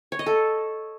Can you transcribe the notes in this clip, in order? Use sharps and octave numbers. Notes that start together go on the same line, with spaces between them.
C#5
D#5
A4